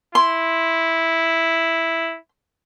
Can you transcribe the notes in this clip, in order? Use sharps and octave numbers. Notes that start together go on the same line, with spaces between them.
E4 C6